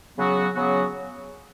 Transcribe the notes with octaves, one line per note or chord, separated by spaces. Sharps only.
C#3 F#3 B3 F#4
C#3 F#3 B3 F#4